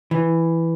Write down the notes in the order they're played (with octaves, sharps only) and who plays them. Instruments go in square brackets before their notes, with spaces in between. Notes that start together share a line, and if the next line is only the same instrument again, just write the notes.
[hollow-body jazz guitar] E3